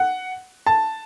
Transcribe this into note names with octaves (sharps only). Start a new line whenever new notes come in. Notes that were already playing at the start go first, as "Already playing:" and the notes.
Already playing: F#5
A5